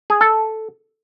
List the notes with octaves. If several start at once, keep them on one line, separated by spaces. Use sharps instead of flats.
G#4
A4